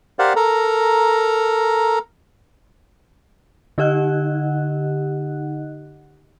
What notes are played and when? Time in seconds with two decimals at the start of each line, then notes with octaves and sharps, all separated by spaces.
0.19 G4 A#4 C5 D5 F5 F#5
0.36 A4 A#4 A#5
3.78 D3 D#4 G4 D#5 F#5 F#6